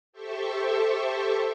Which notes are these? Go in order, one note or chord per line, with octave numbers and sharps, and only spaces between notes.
G4 A4 C5 E5 C#6